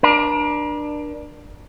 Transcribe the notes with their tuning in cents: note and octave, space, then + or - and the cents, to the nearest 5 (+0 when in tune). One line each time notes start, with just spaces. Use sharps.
D4 +15 A#4 +45